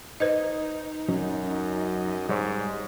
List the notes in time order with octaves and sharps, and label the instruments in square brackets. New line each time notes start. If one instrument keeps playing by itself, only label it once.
[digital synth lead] D#4 [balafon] B4 C5 D#5
[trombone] F#2 [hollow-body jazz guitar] F#3 C#4
[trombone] G#2 [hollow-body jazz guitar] G3 C#5